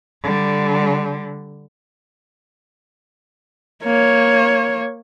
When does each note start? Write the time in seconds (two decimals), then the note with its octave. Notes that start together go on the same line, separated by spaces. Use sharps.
0.23 D3 G3
3.83 A#3 C#5